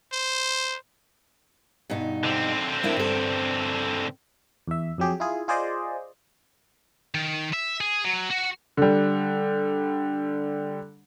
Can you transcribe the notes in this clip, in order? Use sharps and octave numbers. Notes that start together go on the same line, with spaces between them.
C5
G2 B2 D#4
D3 C4
A#3 D4 E4
G2 A4
E2 E5
F2 F#3 G4 G#4
E4 F4 G#4
F4 G#4 C5 D5 D#5
D#3
E5
G#4
F#3
F#4
D3 G3